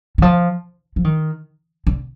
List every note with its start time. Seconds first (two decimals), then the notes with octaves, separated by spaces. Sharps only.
0.18 D#3
0.22 F3
0.96 F3
1.04 D#3
1.87 D3